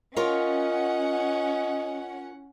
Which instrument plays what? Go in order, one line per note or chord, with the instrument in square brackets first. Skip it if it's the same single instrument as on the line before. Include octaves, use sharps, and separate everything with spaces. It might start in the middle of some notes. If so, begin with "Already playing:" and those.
[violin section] C#4 F#5 [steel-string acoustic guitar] F4 A#4 C#5 [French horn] D#5